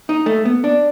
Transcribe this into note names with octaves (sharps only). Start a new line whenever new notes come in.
D#4
A3
B3
D4